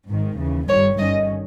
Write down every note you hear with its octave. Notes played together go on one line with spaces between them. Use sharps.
G#1 G#2 D#3
D#2 C#3 E3
G1 G2 D#3 G3 C#5
G1 G2 D#3 G3 C#4 D#5